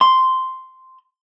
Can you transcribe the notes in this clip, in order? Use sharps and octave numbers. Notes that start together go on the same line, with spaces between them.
C6